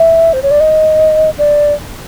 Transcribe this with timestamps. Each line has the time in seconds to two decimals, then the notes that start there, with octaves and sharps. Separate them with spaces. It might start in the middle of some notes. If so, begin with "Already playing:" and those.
Already playing: E5
0.33 C5
0.43 C#5
0.51 D5
0.60 D#5
1.38 D5